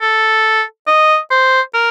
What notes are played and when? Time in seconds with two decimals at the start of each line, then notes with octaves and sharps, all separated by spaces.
0.02 A4
0.87 D#5
1.31 C5
1.74 A#4